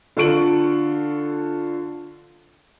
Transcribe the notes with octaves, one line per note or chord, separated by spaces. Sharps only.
D3 F4 A4 C#6 D7 F#7